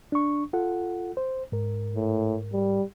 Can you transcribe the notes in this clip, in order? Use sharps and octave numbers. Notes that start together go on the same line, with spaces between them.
D4 C#6
F4 A4 F#5
C5
G#2 A#4
A2
G3